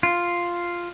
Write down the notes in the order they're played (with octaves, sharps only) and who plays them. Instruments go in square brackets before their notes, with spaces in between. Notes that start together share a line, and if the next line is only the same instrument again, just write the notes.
[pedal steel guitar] F4